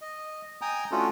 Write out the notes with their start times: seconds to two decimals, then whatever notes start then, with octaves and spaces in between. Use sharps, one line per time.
0.01 D#5
0.62 G5 G#5 A#5 D#6
0.92 A3 C#4 D4 F4 F#4 A4